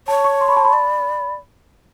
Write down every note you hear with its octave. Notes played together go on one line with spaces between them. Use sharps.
C#5 A5
C#6
C6
B5
A5
B5
D5